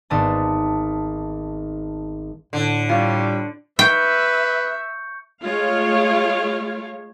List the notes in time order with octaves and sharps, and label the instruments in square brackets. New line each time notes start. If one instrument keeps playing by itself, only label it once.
[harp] G#1 B3 D5 A5 D#6
[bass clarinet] A2 [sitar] D3
[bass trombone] G3 [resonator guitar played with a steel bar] F4 C#5
[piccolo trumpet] B4 [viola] E5 [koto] G5 [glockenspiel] C#6 G6 C#7
[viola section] G#3 A3 F4 C#5 F5